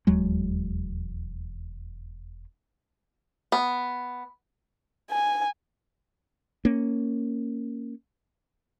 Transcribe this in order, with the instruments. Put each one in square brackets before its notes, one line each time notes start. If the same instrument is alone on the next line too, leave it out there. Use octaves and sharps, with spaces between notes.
[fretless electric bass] E1 D#2 F#3 G#3
[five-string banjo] B3
[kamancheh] G#5
[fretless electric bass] A#3 C#4